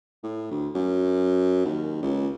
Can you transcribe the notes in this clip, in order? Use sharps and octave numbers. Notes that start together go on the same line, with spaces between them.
A2
D2
F#2
D#2
C#2